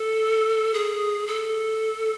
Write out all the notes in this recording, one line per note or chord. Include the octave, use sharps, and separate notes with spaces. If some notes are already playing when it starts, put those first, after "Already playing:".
Already playing: A4
G#4
A4